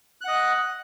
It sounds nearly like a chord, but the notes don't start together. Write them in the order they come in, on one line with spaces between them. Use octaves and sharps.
F#6 F#5 D#5